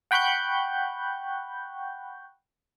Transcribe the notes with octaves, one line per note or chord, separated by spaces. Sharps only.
F#5 G5 B5 C#6 F#6 G6